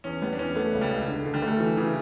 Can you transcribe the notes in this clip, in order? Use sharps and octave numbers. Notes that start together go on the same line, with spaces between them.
E2 C#4
G3 B3
D4
E2 C#4
A3 B3
C#2
G3
C#2
D3
D3
G3
A3
G3
E3 F#3
C#3 E3